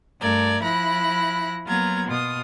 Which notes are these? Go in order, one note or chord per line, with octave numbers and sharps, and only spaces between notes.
G2 A3 A#4 D5 G#6
F3 E4 B5 F#6 A#6
F#3 A#3 B3 F4 A#5 G#6
B2 F4 D#6